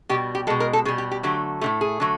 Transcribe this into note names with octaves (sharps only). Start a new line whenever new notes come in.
B2 G3 G4
G4
B2 G#3 A4
A#4
A4
B2 G3 G#4
G4
G4
D3 F#3 A3 G4
A2 E3 A3 G4
G#4
D3 F#3 A3